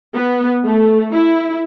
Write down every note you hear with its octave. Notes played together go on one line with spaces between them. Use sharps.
B3
A3
E4